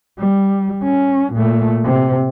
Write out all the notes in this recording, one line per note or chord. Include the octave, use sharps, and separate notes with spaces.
G3
C#4
A#2 A3
C3